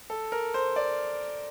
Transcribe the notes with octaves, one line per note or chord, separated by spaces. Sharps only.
A4
A#4
C5
D5